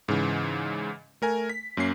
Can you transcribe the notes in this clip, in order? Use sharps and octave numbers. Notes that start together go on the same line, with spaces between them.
G#2 C#3 E3
A3 A#4 G#5
B6
F#2 A#3 C#4 C7